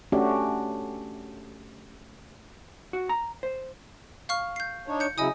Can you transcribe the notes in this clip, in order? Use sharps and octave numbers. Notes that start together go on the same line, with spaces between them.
A3 C#4 D4 F#4 G4
F#4
A#5
C5
F5 C#6 F6
G6 C7
D4 D#4 C#5
G6 C#7
C#3 F#3 E4 D#5 G#5 D#6